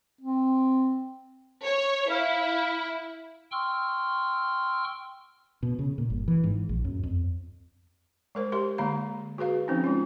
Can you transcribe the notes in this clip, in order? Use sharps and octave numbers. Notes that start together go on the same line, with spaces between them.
C4
C#5
E4 F5
G5 C6 C#6 E6 F6
B2
C#3
A#2
G1
E3
G#2
A#1
F#2
F2
G#3 A#4 C5
G4 A#4 C6
D3 G#3 A#3 F5 B5
F#4 G#4 B4 F5
F3 C4 C#4 D#4
G#3 C#4 F4